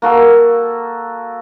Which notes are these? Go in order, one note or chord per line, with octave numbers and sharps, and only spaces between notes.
A#3 F#4 A4